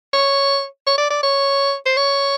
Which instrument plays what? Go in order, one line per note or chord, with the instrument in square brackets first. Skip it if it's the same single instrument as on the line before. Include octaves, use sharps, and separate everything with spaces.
[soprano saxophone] C#5
C#5
D5
D5
C#5
C5
C#5